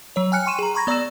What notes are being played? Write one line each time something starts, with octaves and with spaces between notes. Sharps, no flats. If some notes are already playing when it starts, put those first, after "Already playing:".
F#3 C#5
G5 G#5 F6 F#6 C#7
G5 C6 C#6 D#7 E7
G#4 A#5
A#5 B5 C#6 G#6 A#6
B3 D5 A#5 E6 A#6 E7